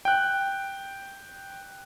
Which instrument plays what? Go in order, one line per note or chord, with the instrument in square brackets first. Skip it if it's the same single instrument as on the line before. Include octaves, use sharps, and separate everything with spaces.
[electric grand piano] G5 F#6